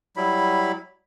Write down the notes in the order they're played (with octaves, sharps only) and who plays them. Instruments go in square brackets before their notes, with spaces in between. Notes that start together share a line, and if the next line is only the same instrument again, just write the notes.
[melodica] F#3 G3 E4 B5